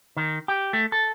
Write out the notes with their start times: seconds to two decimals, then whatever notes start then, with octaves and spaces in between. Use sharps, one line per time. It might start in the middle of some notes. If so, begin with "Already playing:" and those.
0.17 D#3
0.48 G4
0.73 A3
0.92 A4